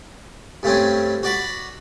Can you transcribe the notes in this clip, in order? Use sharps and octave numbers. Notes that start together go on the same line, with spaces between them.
G2 A3 C4 C#4
F#4 D5 B5